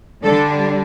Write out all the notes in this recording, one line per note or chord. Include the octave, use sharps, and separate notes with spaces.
D3 G3 D4 A4